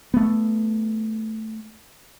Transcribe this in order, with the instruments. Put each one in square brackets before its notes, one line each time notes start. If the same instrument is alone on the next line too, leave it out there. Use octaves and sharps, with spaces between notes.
[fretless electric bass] A3 B3